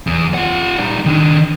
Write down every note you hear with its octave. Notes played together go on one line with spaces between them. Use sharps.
E2
F4 F#5
G3 D#4
D#3 D4